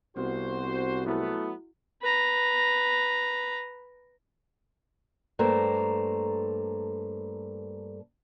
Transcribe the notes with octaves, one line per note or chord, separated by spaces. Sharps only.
C2 B3 C4 F#4 C5
F#3 A3 B3 E4 F#4
B4 A#5
G2 A3 A#3 A4 C5 A#5